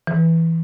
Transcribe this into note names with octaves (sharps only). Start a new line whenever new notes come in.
E3